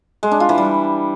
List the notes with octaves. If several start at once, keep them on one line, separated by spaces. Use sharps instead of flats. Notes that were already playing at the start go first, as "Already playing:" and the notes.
G#3
D4
F4
E3
G3